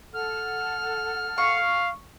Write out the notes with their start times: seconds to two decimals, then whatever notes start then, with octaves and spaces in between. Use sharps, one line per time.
0.14 A4 F#5 F6
1.38 F5 C#6